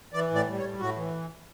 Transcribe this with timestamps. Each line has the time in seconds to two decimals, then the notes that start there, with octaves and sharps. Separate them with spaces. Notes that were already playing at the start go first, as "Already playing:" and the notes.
0.13 E3 D5
0.30 A2 D5
0.47 G3
0.58 C#5
0.64 A2
0.79 A2 F#4
0.96 E3